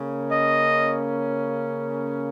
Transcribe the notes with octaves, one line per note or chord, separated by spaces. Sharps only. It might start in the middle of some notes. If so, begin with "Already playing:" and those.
Already playing: C#3 A#3 C#4
D#5